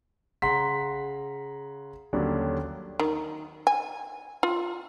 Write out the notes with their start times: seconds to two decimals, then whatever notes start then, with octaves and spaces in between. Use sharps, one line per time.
0.42 C#3 F#5 A#5 C6 B6
2.13 D#2 D3 F#3 G3 C#4 D4
3.00 D#3
3.67 G#5
4.43 F4